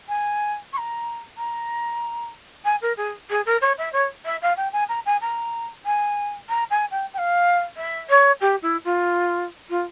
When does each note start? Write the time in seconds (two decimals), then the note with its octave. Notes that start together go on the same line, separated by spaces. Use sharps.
0.08 G#5
0.73 C#6
0.77 A#5
1.37 A#5
2.65 G#5
2.81 A#4
2.96 G#4
3.30 G#4
3.45 A#4
3.61 C#5
3.78 E5
3.92 C#5
4.25 E5
4.42 F5
4.57 G5
4.72 G#5
4.88 A#5
5.05 G#5
5.21 A#5
5.85 G#5
6.49 A#5
6.70 G#5
6.91 G5
7.13 G5
7.18 F5
7.76 E5
8.09 C#5
8.40 G4
8.62 E4
8.84 F4
9.69 F4